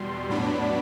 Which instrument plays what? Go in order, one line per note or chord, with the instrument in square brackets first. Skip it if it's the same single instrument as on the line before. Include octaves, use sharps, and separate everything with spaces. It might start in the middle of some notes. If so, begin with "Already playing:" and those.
Already playing: [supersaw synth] E2 B2 G3 C6
A2 F#3 B3 D4 B5